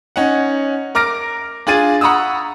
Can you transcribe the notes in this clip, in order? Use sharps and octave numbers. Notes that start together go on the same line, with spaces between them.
C#4 D#4 F#5
A#4 D6 F6 A#6 D7
D4 F4 G#4 A6 D#7
F#5 A#5 B5 C#6 D#6 E6